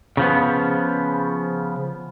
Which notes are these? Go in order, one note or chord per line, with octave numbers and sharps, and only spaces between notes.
C#3 F3 B3